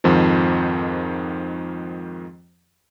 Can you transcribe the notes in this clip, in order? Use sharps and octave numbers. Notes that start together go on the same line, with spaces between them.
F2 G#2 D#3 F3